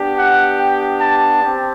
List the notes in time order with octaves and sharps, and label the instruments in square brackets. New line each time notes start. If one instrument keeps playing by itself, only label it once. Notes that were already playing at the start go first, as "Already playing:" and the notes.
Already playing: [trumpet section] B3 D4 G4
F#5
G5
A5
C4 G4